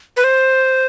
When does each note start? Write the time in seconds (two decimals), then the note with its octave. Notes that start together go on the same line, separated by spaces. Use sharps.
0.17 B4
0.24 C5